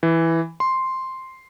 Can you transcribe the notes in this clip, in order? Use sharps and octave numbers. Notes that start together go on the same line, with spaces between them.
E3
C6